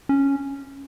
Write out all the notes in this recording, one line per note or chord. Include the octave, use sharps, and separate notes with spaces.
C#4